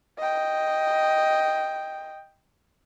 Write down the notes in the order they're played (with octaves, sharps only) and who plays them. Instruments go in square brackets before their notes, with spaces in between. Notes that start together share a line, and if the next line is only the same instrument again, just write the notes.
[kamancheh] D#5 G5